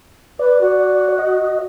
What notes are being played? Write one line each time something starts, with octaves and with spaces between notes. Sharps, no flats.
B4 D5
F#4
D#5